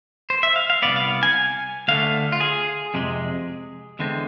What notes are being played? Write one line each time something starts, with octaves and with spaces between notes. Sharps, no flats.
C5
E5
F5
F5
C2 B2 B3 D5
F5
G#5
D2 D3 A3 F5
F4
G#4
F2 C3 G#3
E2 D3 G#3 C4